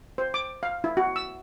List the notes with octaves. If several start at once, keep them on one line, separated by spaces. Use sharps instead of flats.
C5
D6
F5
E4
F#4
E6